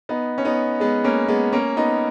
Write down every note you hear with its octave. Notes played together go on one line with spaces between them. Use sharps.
B3 D#4
C#4
B3 D#4
G#3 B3
A#3 C#4
G#3 B3
A#3 C#4
B3 D#4